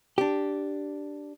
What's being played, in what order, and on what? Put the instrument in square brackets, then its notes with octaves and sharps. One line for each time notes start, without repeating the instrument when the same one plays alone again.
[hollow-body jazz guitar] D4 G4